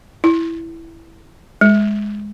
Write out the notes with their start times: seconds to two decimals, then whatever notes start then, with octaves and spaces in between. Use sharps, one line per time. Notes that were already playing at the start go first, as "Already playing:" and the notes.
0.24 E4
1.61 G#3